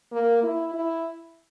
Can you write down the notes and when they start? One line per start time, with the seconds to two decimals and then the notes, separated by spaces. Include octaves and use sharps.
0.12 A#3
0.43 E4
0.74 E4